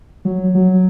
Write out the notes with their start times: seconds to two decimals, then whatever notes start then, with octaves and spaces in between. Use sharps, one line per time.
0.25 F#3
0.55 F#3